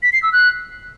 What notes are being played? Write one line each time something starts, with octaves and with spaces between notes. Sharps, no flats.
B6
C7
E6
F#6